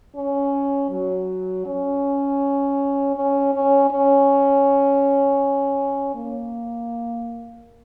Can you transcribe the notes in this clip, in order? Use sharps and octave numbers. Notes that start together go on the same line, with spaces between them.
C#4
F#3
C#4
C#4
C#4
C#4
A#3